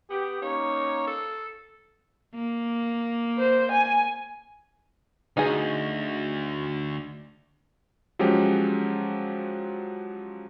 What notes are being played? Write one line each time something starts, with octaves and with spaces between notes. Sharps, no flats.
B3 G4
A#3 C#4 D#4 C#5
A4
A#3
C5
G#5
D2 D#4 F#4 G#4
F3 F#3 G#3 C#4 G4